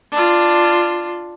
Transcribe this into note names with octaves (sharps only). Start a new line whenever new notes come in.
D4 F4